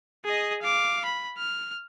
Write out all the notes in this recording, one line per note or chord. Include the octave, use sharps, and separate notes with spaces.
G#4 D#5
F5 D6
B5
F6